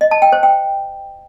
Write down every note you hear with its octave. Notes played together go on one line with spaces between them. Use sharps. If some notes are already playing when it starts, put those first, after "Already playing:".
D#5
A5
G5
C5
G5